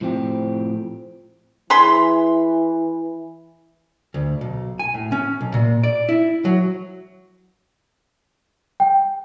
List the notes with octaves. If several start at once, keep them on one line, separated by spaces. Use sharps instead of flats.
A2 F3 C4 G4
E3 G#4 B5 C6
D2
B1
G#5
A2
C#4
B1
A#2
D5
E4
F#3
G5